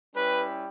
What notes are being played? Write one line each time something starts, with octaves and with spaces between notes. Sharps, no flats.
G3 C#4 E4 G4 B4